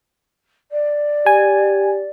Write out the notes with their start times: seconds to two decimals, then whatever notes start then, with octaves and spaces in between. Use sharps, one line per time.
0.71 D5
1.26 G4 G#5